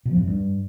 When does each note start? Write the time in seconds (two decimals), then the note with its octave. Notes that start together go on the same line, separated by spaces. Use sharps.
0.05 B2
0.11 F3
0.16 F2
0.22 F#2
0.27 G2